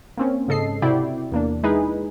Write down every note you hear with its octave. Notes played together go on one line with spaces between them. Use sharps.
A#3 C4 C#4
G#2 C#3 A4 D#5 C7
C3 E4 F#4 D5 G5
E2 A#3 D4
G#3 D#4 E4 G#4 B4